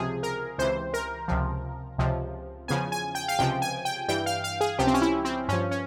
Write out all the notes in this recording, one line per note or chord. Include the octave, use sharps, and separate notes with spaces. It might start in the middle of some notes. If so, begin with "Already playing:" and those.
Already playing: C#2 C3 F3 G#4
A#4
C#2 C3 E3 C5
A#4
C#2 C3 F3
C#2 C3 F3
E2 C#3 F3 G#5
G#5
G5
F5
C#2 C3 F3 G5
G#5
G5
G2 E3 G5
F5
F5
G#4
C#2 C3 F3 G4
C4
C#4
E4
C4
G2 F3 C#4
C#4